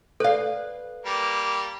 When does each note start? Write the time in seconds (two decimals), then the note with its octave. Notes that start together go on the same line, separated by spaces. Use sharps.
0.20 A4 B4 D5 F5
1.05 G3 A#3